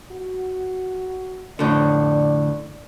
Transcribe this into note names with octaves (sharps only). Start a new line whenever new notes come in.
F#4
F2 A2 D3 D5